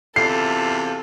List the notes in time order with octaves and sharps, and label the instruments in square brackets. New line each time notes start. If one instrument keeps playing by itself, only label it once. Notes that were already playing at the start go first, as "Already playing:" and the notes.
[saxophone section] E2 C3 F4 [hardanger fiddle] A4 [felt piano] C7